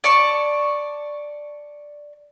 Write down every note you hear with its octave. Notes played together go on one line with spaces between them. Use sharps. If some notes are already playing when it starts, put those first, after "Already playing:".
D5 A5 C#6